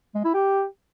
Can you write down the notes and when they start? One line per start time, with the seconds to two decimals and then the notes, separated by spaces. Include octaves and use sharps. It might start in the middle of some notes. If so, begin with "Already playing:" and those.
0.15 G#3
0.24 E4
0.34 G4